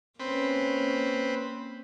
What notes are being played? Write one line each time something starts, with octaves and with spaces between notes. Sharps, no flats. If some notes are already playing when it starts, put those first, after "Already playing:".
A#3 C4 C#4 B4